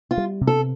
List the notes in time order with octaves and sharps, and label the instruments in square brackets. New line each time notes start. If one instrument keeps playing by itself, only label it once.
[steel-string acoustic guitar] F4
[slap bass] G3
C3
[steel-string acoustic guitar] A4